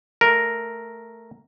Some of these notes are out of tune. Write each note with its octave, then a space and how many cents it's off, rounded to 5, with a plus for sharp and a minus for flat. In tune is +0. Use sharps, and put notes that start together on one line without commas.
A3 +0 A#4 +0